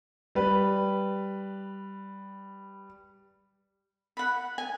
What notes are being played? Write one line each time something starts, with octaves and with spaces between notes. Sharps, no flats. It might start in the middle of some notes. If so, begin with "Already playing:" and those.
G3 B4
F#5 B5
G#5